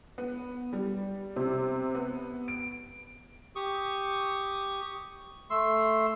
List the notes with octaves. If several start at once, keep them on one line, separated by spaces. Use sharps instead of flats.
B3
G3
C3
B3
D7
G4 C#6 D#6
A3 C6 E6